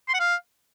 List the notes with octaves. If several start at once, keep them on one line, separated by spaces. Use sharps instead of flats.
C6
F#5
F5